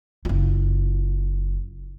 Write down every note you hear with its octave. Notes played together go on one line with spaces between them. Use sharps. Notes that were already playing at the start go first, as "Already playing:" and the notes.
F#1 F4